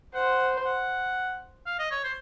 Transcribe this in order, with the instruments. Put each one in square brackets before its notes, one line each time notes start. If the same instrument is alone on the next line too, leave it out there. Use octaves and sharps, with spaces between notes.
[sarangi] C5 [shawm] F#5
[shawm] F#5
F5
D#5
C#5
C5